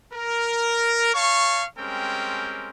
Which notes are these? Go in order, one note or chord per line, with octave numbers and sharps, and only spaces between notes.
A#4
C#5 F5 A5 C#6
G3 G#3 C4 C#4 A#4 G5